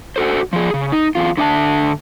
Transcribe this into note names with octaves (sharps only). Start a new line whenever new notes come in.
F#4 G4 A4 C5
F3 G#4
C#3
D#4
E2 F4
D3 D4 E5 G5 A5